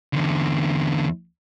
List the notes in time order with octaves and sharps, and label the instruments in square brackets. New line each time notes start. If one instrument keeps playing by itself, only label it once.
[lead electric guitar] E2 D3